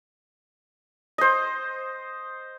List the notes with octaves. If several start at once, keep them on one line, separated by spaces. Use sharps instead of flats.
C5 D#5